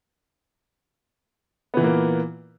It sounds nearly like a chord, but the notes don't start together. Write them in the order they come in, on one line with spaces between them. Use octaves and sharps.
B3 E3 A#2 A#3